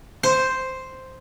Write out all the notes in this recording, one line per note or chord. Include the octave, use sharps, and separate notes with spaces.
C5